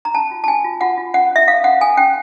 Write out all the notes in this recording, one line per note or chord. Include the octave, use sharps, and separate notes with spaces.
A#5
C#4 A5
F4
A5
C#4 G#5
F4
F4 F#5
F4
C#4 F#5
C#4 E5
A4 F5
C#4 F#5
A4 G#5
C#4 G5